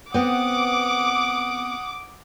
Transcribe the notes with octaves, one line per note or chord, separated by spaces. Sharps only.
B3 C4 F#5 D6 D#6